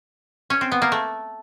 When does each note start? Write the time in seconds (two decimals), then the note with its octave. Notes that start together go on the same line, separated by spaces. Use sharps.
0.50 C#4
0.61 C4
0.72 B3
0.82 A#3
0.92 A3